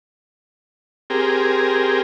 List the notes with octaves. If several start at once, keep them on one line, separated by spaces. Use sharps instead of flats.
C4 G4 G#4 A#4